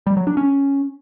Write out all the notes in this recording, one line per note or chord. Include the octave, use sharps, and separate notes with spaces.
G3
F#3
D4
C#4